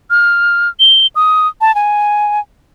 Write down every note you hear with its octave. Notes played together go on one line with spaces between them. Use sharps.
F6
G7
D#6
A5
G#5